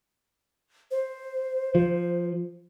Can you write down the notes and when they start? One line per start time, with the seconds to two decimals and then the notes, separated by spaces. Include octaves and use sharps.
0.91 C5
1.75 F3